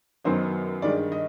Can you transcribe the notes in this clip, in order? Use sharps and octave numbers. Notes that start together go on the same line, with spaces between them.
F#2 D#3 F#3 B3 C5
G2 D#3 G#3 D5
D#5